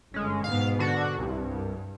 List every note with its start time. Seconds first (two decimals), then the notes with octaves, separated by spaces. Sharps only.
0.14 G1 G#3 C#4
0.44 G#2 B2 B3 F5
0.79 D3 D4 F#4
1.18 C2 G2